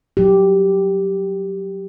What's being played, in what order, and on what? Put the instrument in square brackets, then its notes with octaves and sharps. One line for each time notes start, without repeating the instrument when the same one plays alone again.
[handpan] F#3 G4